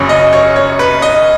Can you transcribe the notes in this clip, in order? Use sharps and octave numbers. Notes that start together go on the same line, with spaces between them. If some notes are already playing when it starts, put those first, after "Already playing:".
Already playing: F#1 F#2 C#3 C#5
D#5
C#5
C#5
B4
D#5